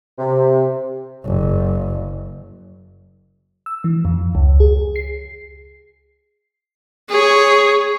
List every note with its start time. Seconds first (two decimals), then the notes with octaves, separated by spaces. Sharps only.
0.19 C3
1.26 F#1
3.66 E6
3.84 E3
4.05 F2
4.35 C#2
4.60 G#4
4.96 C7
7.10 G#4 C#5